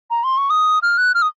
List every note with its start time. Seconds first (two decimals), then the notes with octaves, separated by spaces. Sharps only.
0.10 A#5
0.24 C6
0.37 C#6
0.50 D#6
0.82 F6
0.98 F#6
1.14 F6
1.22 D#6